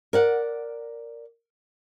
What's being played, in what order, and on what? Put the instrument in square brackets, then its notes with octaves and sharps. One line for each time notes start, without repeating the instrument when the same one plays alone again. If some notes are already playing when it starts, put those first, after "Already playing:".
[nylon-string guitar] A#4 D5 F#5